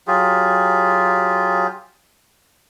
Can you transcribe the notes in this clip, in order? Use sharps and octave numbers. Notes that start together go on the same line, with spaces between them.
F#3 F4 G4 G#4